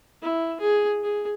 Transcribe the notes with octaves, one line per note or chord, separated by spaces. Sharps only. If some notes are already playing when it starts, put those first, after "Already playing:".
E4
G#4
G#4